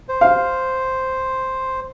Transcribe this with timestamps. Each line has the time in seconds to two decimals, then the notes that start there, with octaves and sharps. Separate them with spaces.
0.09 C5
0.21 F5